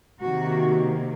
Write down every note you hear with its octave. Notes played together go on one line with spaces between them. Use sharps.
C3 D#3 A#3 F#4